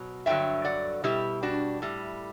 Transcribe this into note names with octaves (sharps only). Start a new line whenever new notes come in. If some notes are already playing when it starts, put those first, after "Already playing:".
Already playing: B2 F#3
G2 D3 F#3 E5 G5
D5 F#5
B2 G3 E4 G4
D4 F#4
A2 G3